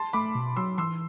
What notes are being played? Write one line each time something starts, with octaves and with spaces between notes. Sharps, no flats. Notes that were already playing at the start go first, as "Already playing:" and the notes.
Already playing: A5 C6
A3 B5 D6
B2
F#3 C6 E6
E3 C6 E6